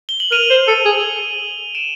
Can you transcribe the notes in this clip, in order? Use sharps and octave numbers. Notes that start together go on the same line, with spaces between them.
G7
F#7
A#4 D#7 F7
C5
A4
G#4
D7 E7